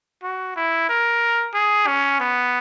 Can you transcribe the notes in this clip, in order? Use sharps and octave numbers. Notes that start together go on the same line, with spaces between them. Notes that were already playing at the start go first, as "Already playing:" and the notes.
F#4
E4
A#4
G#4
C#4
B3